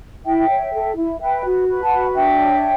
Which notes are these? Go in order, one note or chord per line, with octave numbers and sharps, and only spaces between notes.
E4 E5 G5
C#5
A4
E4
B4 E5 G5
F#4
B4
F#5 A5
F#4
D4 E5 G5
C#5